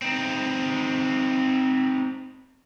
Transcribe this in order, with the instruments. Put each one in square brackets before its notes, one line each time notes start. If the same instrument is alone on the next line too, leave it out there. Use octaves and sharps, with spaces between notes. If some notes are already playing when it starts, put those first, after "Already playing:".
[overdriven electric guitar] C4 D#4